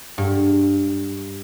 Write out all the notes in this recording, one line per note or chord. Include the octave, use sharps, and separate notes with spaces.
G2